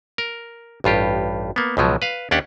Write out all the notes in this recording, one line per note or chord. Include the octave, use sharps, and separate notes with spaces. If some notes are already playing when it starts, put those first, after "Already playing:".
A#4
A1 G2 F4 G4
A#3 B3
C#2 B2 F3 F#3
B4 F5
D#2 C#4 D4 G4 F#5